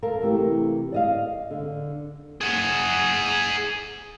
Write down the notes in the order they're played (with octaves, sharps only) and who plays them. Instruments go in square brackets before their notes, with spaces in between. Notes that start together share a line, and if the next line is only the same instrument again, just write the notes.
[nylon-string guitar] A4 A#4 F5
C3 E3 A3 G4
D5 D#5 F5
D3
[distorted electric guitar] G#4 F#5